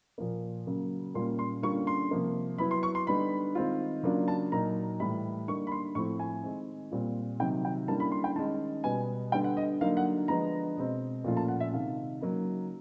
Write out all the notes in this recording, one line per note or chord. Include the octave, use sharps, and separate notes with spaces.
A#2 F3 A#3
C#3 F#3 A#3
A#2 G3 A#3 C#4 F4 C6
C6
D3 G3 A#3 C#4 F4 C#6
C6
C3 F3 A#3
F#3 B3 E4 B5
C6
C#6
C6
D3 G3 B3 D#4 B5
D#3 G#3 C4 F4
C#3 F#3 A#3 D4 F4
A5
A#2 F#3 A#3 D#4 A#5
A2 E3 G3 B5
D3 G3 A#3 D#4 C#6
B5
C6
A2 F3 A3 C4 E4 C#6
G#5
D#3 G#3 C4
A#2 G3 C4 F4
C3 D#3 F#3 G5
G5
D3 G3 A#3 C#4 E4 A5
B5
C6
G5
D#3 G#3 C#4 A5
B2 G3 B3 G#5
D3 G3 B3 G5
F#5
D#5
D3 F#3 A#3 D#4 F5
F#5
D3 F3 G#3 B3 A#5
B2 G#3 C4
A#2 F3 A3 C#4 F4
A5
F#5
E5
C3 D#3 G#3 F5
C#3 F#3 A#3 D#4